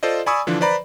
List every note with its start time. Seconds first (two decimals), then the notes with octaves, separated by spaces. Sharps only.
0.03 F4 A4 C5 D5 D#5
0.26 D5 G#5 B5 C#6 D#6 E6
0.47 D3 E3 F3 D4
0.61 B4 C5 D5 A#5 B5